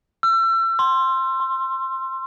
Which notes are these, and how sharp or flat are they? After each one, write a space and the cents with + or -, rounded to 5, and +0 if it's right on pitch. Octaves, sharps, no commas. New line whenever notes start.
E6 +35
C6 +10
C6 +25